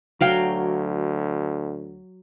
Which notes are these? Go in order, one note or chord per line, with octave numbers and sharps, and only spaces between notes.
D2 F#3 F5 G5